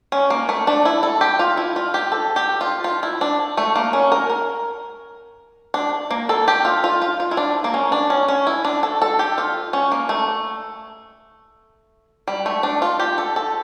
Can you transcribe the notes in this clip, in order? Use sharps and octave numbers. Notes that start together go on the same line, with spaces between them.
C#4
A#3
A3
D4
E4
A4
G4
F4
E4
F4
G4
A4
G4
F4
F4
E4
D4
A3
A#3
C#4
A#4
A#4
D4
A#3
A4
G4
F4
F4
F4
F4
E4
D4
A#3
C#4
D4
C#4
C#4
E4
D4
A4
A4
G4
F4
C#4
A#3
A3
G3
A3
D4
F4
G4
A4
A4